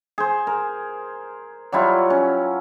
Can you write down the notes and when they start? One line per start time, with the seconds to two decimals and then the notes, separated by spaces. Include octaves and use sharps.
0.18 G#4 C5
0.47 A#4
1.72 F#3 G3 E4 F4
2.10 C#4